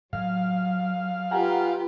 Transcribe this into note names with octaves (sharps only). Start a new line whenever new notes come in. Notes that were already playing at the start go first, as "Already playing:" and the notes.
A2 F#3 F5
F4 G4 B4 F#5 G#5 A#5